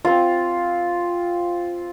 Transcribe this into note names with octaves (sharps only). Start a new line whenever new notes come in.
C4 F4